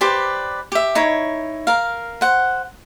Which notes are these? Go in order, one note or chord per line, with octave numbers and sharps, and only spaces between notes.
G4 B4 C5 D5
G4 E5
D#4 E4 C#5
A#4 F5
C5 F#5